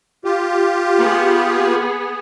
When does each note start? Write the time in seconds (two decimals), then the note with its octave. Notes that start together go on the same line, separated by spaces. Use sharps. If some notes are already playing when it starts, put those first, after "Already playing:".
0.25 F4 G4
0.99 B3 G#4